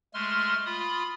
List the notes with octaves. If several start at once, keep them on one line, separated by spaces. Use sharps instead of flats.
G#3 A3 C6 F6
F4 B5 D#6